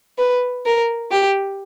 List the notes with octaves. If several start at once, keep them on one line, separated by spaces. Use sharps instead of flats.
B4
A#4
G4